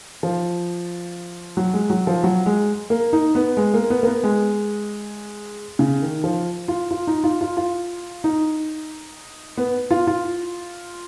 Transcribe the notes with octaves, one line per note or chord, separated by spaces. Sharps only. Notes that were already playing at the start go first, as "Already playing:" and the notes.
F3
F#3
G#3
F#3
F3
F#3
G#3
A#3
D#4
B3
G#3
A#3
B3
A#3
B3
G#3
C#3
D#3
F3
F4
F4
D#4
F4
F4
F4
D#4
B3
F4
F4